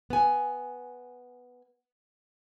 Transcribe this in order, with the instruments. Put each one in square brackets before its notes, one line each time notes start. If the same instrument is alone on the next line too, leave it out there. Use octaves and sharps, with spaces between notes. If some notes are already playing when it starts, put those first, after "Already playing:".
[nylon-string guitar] B3 G#5